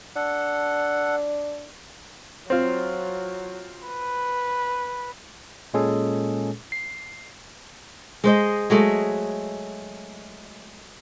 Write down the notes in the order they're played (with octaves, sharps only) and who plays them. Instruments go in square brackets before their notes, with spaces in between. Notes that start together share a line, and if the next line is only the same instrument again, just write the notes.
[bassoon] D4 [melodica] A4 F#5
[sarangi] F#3 [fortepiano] C4 F4
[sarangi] B4
[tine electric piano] A#2 G#3 C#4 G#4 A4
C7
[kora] G#3 C5 D#5
F#3 G#3 A3